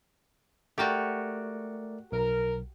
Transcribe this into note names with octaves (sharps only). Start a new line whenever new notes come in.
A3 F#4 G4 A#4 D5
B1 A#4